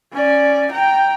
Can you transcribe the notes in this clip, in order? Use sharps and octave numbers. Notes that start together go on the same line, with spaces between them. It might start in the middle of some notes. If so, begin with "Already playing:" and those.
C#4 D5
G5 A#5